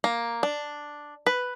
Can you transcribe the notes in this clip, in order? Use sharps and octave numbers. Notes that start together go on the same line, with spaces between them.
A#3
D4
B4